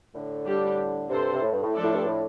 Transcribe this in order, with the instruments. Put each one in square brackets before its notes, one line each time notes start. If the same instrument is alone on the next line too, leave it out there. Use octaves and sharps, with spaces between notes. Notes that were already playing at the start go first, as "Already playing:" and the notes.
[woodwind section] A2 D3
[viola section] G3 D4 G4
[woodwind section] G2 C3 [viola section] C4 A4 C5
[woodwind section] C3
A2
G2
A2
[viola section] F3 A3 D4 A4 D5
[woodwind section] A2
G2
A2